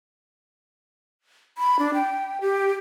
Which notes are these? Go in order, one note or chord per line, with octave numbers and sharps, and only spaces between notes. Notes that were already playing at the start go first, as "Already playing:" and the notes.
B5
D4
G5
G4